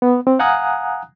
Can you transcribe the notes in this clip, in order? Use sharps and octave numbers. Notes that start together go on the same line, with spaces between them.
B3
C4
F5 F#5 G#5 A#5 D#6 F#6